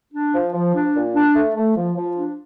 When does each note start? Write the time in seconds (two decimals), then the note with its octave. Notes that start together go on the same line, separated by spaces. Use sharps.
0.13 D4
0.34 F3
0.53 F3
0.75 D4
0.95 A#2
1.15 D4
1.35 A3
1.56 A3
1.77 F3
1.97 F3
2.17 D4